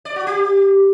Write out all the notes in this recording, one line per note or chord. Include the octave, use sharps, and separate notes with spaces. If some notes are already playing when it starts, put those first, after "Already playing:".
D5
F#4
G4